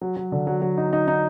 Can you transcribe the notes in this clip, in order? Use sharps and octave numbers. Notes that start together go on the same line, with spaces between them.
F#3
F#3
D3
F#3
F#3
D#4
D#4
D#4